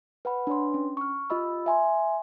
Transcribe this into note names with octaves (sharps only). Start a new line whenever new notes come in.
B4 F#5 B5
D4 B4 C#5 C6
C#4
C#6 F6
F4 G4 D#5 B5 E6
E5 G#5 C6